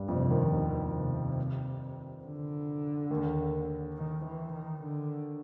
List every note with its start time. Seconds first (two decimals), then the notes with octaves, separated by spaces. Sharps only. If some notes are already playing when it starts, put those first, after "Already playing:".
Already playing: G2 G3
0.08 F2 C3 F3
0.30 D#2 D#3
0.51 D#2 B2 D#3
0.95 C3
2.25 D3
3.10 D#2 D#3
3.97 D#3
4.25 E3
4.54 D#3
4.83 D3